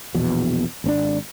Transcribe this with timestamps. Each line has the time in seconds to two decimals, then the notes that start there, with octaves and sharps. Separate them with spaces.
0.14 A#1 E2 B2
0.84 G#1 C4 D4